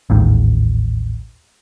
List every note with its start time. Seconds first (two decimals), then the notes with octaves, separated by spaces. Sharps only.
0.10 A1 D#2 G#2